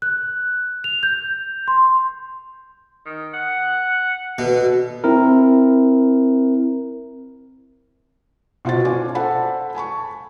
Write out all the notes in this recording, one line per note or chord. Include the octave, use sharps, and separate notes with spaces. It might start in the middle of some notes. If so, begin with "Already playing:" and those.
F#6
F7
G6
C6
D#3
F#5
B2 D3
C4 E4 A#4
B2 F4 F#4 C5 A6
D4 F4 G#5 D6
A4 C5 F#5 A5 B5
G#5 A5 B5 C#6